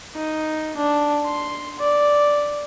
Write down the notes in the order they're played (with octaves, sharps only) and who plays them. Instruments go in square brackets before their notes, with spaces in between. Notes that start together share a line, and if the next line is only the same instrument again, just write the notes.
[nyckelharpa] D#4
D4
C6
D5